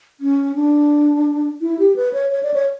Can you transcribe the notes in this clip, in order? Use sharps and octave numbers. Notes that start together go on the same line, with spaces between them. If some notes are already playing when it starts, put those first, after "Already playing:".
C#4
D4
E4
G4
B4
C#5
C#5
D5
C#5